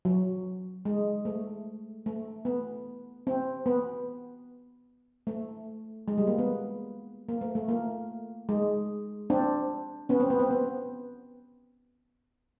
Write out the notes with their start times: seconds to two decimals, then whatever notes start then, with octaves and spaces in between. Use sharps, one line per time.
0.05 F#3
0.85 G#3
1.25 A3
2.06 A3
2.45 B3
3.27 C4
3.66 B3
5.27 A3
6.08 G#3
6.18 G3
6.27 A#3
6.38 B3
7.29 A#3
7.41 A3
7.55 A3
7.68 A#3
8.49 G#3
9.30 C4 D4
10.09 B3 C#4
10.20 C4
10.30 B3
10.40 C4
10.51 B3